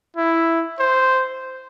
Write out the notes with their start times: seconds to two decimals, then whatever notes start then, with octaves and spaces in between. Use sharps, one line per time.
0.16 E4
0.79 C5